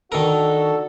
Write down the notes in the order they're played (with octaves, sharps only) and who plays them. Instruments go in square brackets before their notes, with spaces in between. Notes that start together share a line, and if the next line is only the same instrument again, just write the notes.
[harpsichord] D#3 A#4 [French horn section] D4 D#4 F#4 [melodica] A4